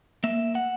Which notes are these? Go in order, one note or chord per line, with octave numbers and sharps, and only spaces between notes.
A#3 E5
F#5